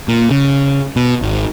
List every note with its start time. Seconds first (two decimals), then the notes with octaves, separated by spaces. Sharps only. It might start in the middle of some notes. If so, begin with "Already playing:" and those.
0.08 A#2
0.31 C#3
0.96 B2
1.22 G#1